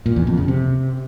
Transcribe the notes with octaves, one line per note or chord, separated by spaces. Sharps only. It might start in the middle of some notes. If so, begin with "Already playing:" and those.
A#2
E2
F2
C#3
C3